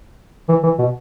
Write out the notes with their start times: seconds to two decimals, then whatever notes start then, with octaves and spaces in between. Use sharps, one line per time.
0.49 E3
0.63 E3
0.79 B2